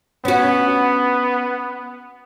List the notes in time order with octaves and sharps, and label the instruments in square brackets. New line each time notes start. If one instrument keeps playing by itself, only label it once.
[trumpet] B3 [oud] C#4 F#4